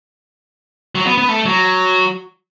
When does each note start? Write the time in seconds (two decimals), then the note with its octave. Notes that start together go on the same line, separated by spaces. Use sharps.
0.95 F#3
1.07 B3
1.18 B3
1.29 A3
1.45 F#3